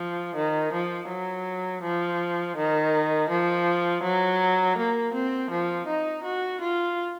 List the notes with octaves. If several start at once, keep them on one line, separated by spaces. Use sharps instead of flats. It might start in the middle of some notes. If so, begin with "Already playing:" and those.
Already playing: F3
D#3
F3
F#3
F3
D#3
F3
F#3
A#3
C4
F3
D#4
F#4
F4